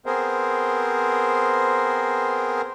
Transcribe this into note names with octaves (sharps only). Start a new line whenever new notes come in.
B3 C4 G#4 A#4 C5